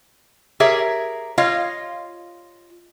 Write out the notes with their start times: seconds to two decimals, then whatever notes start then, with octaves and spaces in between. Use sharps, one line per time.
0.60 G4 G#4 A#4 C#5 E5
1.38 F4 C#5 D#5 F5